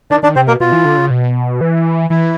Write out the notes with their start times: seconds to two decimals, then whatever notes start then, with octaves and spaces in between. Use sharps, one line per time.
0.10 D#3 D4 D5
0.23 D#3 D4 D5
0.36 C3 C4 C5
0.48 B2 A#3 A#4
0.60 B2 F4
0.72 E3
0.85 D3
0.98 C#3
1.10 B2
1.61 E3
2.10 E3 E4